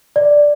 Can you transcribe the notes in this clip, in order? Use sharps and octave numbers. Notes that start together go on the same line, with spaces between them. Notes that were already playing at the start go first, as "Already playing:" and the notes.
D5